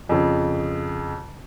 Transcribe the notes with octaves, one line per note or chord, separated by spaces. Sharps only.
F2 C#3